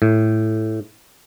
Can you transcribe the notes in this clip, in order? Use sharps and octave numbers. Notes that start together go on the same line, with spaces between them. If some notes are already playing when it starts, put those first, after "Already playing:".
A2